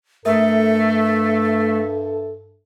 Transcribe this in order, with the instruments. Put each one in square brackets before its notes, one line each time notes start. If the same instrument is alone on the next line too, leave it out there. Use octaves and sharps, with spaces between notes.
[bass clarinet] G2 [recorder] A3 [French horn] A4 [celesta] A#4 E5